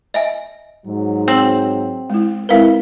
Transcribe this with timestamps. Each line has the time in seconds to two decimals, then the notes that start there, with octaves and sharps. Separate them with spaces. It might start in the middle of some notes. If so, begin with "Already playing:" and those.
0.14 D#5 E5 G#5
0.86 G#2 F#3
1.28 C4 E6 F#7
2.10 G#3 E4
2.49 G#3 C4 E4 A#4 B4 F5